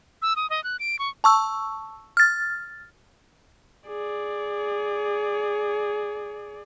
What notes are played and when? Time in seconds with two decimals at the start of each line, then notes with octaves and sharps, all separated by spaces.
0.22 E6
0.36 D#6
0.50 D#5
0.64 F#6
0.80 D7
0.99 C#6
1.24 A5 C#6 E6
2.17 F6 A6
3.87 G#4 D5